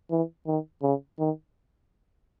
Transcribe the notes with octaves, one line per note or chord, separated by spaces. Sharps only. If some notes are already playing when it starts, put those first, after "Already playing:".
E3
D#3
C#3
D#3